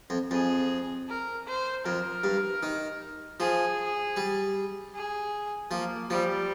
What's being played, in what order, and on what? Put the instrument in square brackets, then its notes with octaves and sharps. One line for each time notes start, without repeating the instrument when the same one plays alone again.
[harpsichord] F2
[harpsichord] F2 [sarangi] G#4
[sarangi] A#4
C5
[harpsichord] F2 [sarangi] A#4
[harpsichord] G2
D#3
[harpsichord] F3 [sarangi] G#4
[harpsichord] G3
[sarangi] G#4
[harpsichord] F3 [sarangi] A#3
[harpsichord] F3 [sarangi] G3